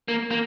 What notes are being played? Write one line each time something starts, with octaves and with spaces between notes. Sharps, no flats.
A#3
A#3